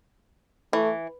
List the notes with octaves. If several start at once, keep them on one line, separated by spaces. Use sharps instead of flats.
E3 A3